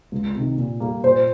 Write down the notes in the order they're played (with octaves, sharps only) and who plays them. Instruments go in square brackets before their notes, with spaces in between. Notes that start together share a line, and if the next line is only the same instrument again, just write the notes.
[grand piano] C#2
C3 D#3
A#2
G3 A#3
[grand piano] A#2 [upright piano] C5